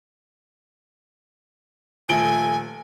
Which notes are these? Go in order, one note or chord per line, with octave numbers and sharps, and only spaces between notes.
D#1 F3 A3 A4 G#5 D7 G7